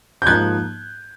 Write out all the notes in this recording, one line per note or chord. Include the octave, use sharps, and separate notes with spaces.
G6
G#2 F3 A#3 D#4 F#6 G#6